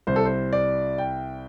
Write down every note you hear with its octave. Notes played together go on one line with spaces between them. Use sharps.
C2 C3 G3 C5
A4
C5
D5
G5